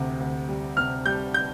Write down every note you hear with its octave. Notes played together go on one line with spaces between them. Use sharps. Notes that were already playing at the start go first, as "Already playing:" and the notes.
Already playing: D2 C3
D2
G3
C3 F6
G3 G6
G6